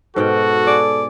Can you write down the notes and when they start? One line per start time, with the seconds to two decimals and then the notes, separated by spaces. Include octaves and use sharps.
0.16 G#2 B2 F#4 A4 G5
0.67 G#4 D5